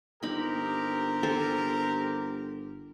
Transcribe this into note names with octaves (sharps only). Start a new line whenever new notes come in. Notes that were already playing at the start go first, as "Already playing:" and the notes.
G1 C4 D#4 G4 A#4 B5
A4 C5 G#5